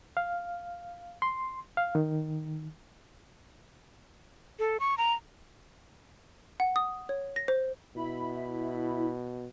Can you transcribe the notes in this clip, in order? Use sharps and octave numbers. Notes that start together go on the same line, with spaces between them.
F5
C6
F5
D#3
A4
C#6
A#5
F#5
D#6
C#5
A#6
C5
B2 E4 B5